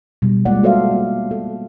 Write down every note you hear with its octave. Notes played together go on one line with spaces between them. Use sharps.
B2 G3
G#3 A#3 F4 D5 F#5
F#4 A4 C5 D5 E5 F5
B3
A4